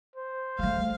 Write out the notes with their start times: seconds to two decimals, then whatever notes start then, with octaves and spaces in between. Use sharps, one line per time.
0.16 C5
0.59 G3 A3 F5